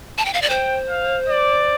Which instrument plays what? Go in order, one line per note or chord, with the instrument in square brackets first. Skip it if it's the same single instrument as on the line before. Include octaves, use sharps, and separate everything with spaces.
[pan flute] A5
G5
F5
D5
[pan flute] C5 [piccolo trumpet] G5
[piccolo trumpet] F5
D5